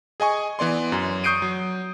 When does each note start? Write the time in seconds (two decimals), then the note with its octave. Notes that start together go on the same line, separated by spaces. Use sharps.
0.20 G#4 D#5 G#5 C#6
0.59 E3 B3 D5 C6
0.92 F#2
1.24 C#6 D#6 G6 C7 D7 D#7
1.42 F#3